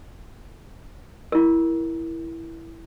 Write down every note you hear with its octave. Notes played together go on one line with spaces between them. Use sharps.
E4 A#4